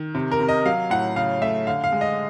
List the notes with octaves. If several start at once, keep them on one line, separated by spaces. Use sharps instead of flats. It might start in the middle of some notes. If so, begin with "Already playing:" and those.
Already playing: D#3
C3
A#4
C3
D#5
F#3 F5
A2 F#5
C#3 F5
A3 E5
D3 F5
F5
G#3
D#5